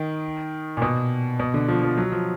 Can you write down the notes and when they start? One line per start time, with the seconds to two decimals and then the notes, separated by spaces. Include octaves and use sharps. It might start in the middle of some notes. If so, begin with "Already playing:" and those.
Already playing: D#3
0.77 A#2
0.82 B2
1.40 B2
1.54 D3
1.68 F3
1.83 F3
1.97 F#3
2.12 F3